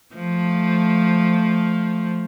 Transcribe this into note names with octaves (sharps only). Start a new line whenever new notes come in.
F3 A3